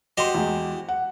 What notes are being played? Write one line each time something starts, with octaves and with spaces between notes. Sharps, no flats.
F#4 G4 C5 D#5 C6
E2 G#3
F#5